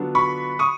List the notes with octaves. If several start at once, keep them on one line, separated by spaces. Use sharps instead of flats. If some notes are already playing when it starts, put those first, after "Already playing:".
Already playing: D3 F#3 B3 D4 F4
B5 C#6
C#6 D#6